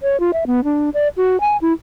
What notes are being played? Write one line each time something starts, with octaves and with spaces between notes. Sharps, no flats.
C#5
F4
E5
B3
D4
D5
F#4
G#5
E4